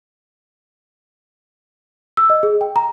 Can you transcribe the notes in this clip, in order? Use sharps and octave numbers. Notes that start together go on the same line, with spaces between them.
E6
D#5
G#4
G5
A#5